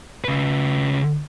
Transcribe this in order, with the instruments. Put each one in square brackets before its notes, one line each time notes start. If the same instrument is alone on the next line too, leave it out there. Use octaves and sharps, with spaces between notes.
[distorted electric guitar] C#3 B4